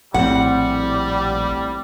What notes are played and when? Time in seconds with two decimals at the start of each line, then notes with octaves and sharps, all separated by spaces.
0.14 A#1 A2 G3 C4 F#5